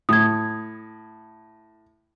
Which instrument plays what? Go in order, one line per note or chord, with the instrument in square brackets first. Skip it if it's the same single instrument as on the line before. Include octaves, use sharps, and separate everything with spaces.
[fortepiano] A2 [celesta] D#6 G#6